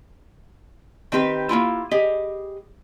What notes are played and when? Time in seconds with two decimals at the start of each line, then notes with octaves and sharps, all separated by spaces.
1.12 D#3 C4 G4 B4
1.49 A#3 C#4 E4 F4
1.91 G4 G#4 D#5